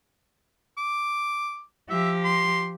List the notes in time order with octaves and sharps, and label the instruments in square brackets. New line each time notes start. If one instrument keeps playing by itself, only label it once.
[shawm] D6
[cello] F3 G4 [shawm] E5
[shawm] C6